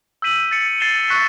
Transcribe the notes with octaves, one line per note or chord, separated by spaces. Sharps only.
E6 G6 B6 D#7 F#7
A6 C#7 F#7
A6 C7 E7 G7
C#6 F#6 B6 E7